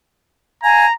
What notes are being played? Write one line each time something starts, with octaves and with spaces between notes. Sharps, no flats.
F5 G#5 A#5 G#6